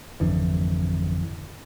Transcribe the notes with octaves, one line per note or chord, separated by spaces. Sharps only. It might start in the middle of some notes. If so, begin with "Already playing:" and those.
G#1 F2 D3 E3